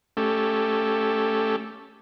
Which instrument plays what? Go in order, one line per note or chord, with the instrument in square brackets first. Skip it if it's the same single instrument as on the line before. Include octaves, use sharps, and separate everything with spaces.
[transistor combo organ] A3 C#4 G4 A4